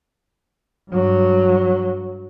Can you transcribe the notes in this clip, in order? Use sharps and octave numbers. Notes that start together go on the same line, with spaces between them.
G2 F#3